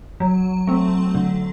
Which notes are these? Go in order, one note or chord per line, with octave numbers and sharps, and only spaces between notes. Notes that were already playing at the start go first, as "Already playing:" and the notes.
F#3
A3 C4
D3